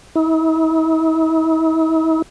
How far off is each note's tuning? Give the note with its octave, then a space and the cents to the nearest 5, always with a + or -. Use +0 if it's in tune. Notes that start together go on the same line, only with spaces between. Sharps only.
E4 -45